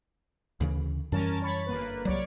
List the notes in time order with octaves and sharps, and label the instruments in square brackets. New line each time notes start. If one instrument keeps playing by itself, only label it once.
[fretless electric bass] D2 C#3 E3
[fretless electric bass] F#2 E3 G3 [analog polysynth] C#4 A#4 A5
[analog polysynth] C#5 B5 A6
G1 A#3 B4
[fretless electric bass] C2 F#3 [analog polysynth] C#5 D5